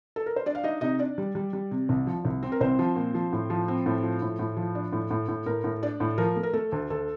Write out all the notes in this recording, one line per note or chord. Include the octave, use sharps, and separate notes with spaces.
A4
A#4
C5
D4 D5
F5
D4 D#4 D#5
C3 D#4 D#5
D4 D5
G3
G3
G3
C3
C2
F3
C2
C4
A#4
C2 C4 C5
F3
A#2
F3
A2
F3
C4
A2
F3
A2
A2
F3
D4
A2
A2
A2
A2 A#4
A2
D4 D5
A2
F3 A#4
A3
A#4
A3 A4
D2
D2 A4